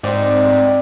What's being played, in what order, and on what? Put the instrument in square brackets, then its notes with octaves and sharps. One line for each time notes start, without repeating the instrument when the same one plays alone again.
[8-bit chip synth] G#2 [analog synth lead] C4 [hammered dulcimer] G4 D5